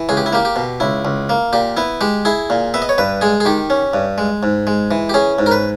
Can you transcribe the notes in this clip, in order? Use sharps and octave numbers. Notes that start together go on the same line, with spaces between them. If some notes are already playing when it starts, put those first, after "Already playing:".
Already playing: E3
C#2 G#4
G4
E4
A#3 G4
G4
B2
C#2 E4
C#2
A#3
A#2 G4
B3 E4
G#3 G4
E4 G#4
A#2
B3 E5
D#5
C#5
G2 B4
G#3 G#4
G#4
D#3 G4
C#4
G2
G#3
G#2
G#3
E3
G4
C#4 G#4
G#2
A#4
B4